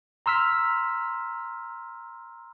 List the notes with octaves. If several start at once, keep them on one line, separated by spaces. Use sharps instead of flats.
A#5 C6 E6 F6 B6